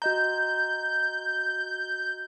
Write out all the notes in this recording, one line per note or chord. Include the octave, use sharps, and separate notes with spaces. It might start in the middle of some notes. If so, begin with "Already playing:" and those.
F#4 D#5 A#5 G6